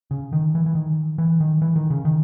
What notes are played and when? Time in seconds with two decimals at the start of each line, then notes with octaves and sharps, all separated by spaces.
0.11 C#3
0.33 D#3
0.55 E3
0.66 E3
0.75 D#3
1.18 E3
1.40 D#3
1.62 E3
1.76 D#3
1.90 C#3
2.05 D#3